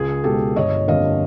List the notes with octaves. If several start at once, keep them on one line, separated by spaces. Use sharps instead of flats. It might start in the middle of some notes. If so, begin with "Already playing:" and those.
Already playing: C#2 G#4
B2 G#3 G4 A4
G1 C#5 D#5
F2 D3 G3 A#3 D#5 F5